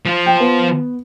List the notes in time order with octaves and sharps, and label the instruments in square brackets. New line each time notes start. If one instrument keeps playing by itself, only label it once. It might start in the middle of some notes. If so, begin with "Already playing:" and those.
[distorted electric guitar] F3 F4
[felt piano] G5
B3